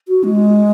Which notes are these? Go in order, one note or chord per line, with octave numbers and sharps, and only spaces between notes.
F#4
G#3